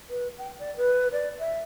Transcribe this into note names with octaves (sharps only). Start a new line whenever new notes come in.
B4
G5
D5
B4
D5
E5